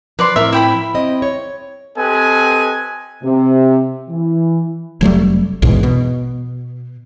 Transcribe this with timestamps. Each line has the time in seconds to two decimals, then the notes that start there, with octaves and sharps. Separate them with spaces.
0.19 F3 B4 D5 C6
0.36 A2 F3 C4 A#4 E5
0.52 E4 G5 B5
0.94 C4 D#5
1.22 C#5
1.97 C4 G4 A4 B4 D#5 G#5
3.24 C3
4.09 E3
5.01 F1 F#3 G3 A3
5.62 A#1 E2 G#2 B2
5.83 B2